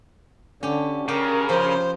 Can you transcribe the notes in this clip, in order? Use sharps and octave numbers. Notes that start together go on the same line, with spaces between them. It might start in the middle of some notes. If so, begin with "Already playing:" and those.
D3 C#4 G4
C#3 G4 A#4
F3 C5 B5